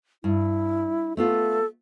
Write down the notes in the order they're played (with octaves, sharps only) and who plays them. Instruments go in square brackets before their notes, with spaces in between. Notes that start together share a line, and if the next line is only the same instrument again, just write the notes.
[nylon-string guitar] G2 [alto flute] E4
[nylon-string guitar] A3 B3 F4 [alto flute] A4